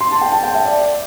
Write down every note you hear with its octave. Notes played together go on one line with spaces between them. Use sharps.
C6
A5
G5
A5
G5
E5
D5